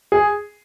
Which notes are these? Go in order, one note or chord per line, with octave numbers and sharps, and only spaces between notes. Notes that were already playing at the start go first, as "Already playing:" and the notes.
G#4